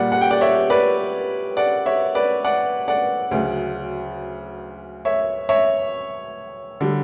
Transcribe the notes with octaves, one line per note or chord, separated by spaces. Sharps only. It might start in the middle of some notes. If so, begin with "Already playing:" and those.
Already playing: A#2 G3 D5 F#5
F#5
G5
D5 F#5
C#5 E5
B4 D5
D5 F#5
C#5 E5
B4 D5
D5 F#5
D5 F#5
D2 C#3 F#3
C#5 E5
C#5 E5
D3 G3